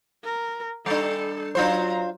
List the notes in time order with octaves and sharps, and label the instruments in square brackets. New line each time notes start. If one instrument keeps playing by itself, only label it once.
[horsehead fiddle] A#4
[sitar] G3 D4 [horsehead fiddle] A4
[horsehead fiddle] F#3 A#5 [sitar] D4 F4 C5